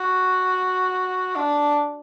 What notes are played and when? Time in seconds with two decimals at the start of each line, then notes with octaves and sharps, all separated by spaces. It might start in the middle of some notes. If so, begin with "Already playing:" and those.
Already playing: F#4
1.36 D4